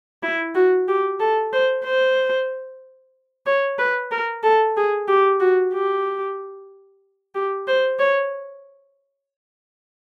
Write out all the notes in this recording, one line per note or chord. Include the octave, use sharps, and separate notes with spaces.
E4
F#4
G4
A4
C5
C5
C#5
B4
A#4
A4
G#4
G4
F#4
G4
G4
C5
C#5